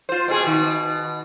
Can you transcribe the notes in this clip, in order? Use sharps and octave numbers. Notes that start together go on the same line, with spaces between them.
F4 C5
B2 C4 G#4
B2 D#3